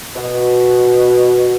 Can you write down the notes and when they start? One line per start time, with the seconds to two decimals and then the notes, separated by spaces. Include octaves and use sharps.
0.16 B2